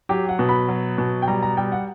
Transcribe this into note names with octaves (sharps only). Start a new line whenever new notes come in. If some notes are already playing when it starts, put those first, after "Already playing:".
F#3 G4
F#5
B2
B5
F#3
B2
G5
G3 A#5
A#5
G3 G5
F#5